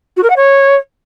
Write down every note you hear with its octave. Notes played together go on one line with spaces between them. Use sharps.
F#4
A#4
F#5
C#5